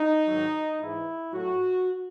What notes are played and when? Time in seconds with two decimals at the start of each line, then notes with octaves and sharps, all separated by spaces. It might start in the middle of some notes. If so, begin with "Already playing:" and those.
Already playing: D#4
0.26 G#2 D#3 F#3
0.80 G#2 E3 G#3 E4
1.33 A2 F#3 A3 F#4